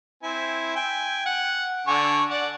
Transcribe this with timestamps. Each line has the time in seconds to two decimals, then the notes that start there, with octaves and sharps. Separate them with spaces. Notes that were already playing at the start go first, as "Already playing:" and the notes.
0.23 C4 E4 G#5
0.76 G5 G#5
1.26 F#5
1.87 D3 G#5 C#6
2.30 D5 F#5